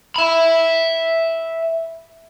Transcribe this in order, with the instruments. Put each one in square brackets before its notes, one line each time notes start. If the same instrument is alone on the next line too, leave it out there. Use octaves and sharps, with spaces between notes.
[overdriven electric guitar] E5 B5